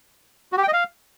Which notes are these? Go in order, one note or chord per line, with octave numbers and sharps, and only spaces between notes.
F#4
G4
G5
D#5
F5